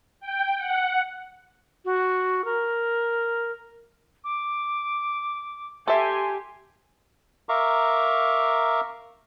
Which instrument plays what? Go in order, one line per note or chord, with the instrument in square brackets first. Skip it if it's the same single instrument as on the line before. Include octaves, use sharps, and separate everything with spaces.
[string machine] G5
F#5
[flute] F#4
A#4
[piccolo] D6
[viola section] G4 G#5 [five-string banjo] A4 E5 [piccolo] C6
[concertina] A#4 E5 F5 A#5 C#6 D6